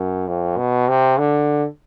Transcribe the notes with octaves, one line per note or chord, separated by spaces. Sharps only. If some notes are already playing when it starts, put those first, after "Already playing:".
Already playing: F#2
F2
B2
C3
D3